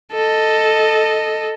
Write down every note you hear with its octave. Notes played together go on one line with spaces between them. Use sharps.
A4 D#5